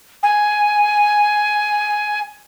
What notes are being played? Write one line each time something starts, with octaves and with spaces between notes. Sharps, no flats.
G#5